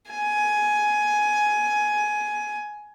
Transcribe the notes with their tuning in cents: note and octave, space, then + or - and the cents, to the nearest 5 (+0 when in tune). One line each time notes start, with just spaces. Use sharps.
G#5 +15